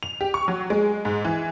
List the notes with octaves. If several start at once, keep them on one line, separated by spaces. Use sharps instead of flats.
F7
G4
C#6
F#3
G#3
G#2
E3